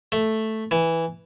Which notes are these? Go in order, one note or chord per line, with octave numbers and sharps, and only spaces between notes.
A3
E3